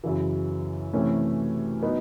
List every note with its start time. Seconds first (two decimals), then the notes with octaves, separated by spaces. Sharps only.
0.04 F#2 C#3 E3
0.93 C3 E3 A3 C#4
1.82 F#3 B3 D#4